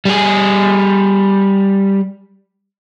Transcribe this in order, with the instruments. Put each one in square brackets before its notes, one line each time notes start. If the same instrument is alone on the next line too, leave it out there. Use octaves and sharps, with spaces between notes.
[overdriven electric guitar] G3 G#4